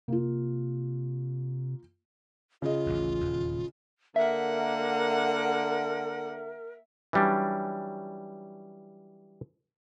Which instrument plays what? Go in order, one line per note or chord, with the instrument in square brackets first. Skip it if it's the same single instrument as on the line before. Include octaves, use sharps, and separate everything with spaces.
[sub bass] C3 [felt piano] A#3 F4
[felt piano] C#3 D#5 [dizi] F4
[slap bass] A1 D#2
D#1 E2
[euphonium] D3 [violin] A#3 F#5 [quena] A#4 [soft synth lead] E5
[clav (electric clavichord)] E3 F#3 G3 C#4 D4